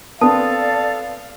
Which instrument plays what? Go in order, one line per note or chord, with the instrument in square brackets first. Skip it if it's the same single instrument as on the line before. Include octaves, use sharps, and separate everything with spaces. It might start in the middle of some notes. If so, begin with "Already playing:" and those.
[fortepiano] B3 C4 [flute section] A4 D5 [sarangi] F5 [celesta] A5 D#6